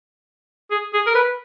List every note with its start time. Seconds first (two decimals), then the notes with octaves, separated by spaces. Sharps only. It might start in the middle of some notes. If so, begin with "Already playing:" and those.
0.71 G#4
0.93 G#4
1.07 A#4
1.15 B4